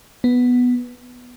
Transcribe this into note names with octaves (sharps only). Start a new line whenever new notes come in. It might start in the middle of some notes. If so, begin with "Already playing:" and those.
B3